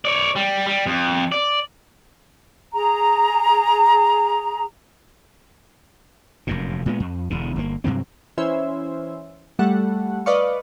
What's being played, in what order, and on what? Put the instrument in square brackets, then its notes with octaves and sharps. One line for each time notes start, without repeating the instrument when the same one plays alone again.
[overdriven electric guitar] C#5 D5
G3
G3
F2
D5
[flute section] G#4 A#5
[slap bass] F1 F#2 A#2
A#2 G#3 A3 B3
F2
E1 E2 D3
G1 A#2 A#3
G2 C3 F#3 C4
[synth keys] E3 C#4 C5 E5
G3 A3 A4 F#5
B4 D5 D#5 F5 C#6